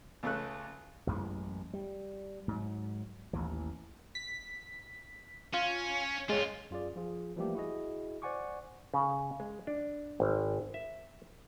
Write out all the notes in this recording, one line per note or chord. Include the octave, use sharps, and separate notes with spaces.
C#2 C#3 A3 A4 F#6
A1 F#2 E3 G#3
G3
G#2 F#3
A1 D#2 E3
B6
C#4 F4
G2 G#3 C#4 F4
F#2 F4 G#4 D5
F3 F4 G#4
E3 F3 G3 A3 A#3 G4
E4 F#4 G#4 D#5
C5 D5 F#5 G#5 C#6 D6
C#3
G#3
D4
G#1
E5